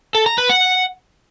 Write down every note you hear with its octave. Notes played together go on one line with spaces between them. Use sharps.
A4
A#5
B4
F#5